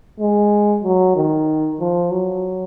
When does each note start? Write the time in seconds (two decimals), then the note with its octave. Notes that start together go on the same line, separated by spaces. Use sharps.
0.20 G#3
0.83 F#3
1.16 D#3
1.80 F3
2.11 F#3